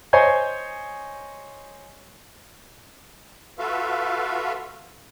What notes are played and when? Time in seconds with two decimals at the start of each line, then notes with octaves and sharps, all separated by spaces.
0.13 C5 C#5 D#5 G#5 G6
3.59 F4 F#4 A4 B4 E5 F5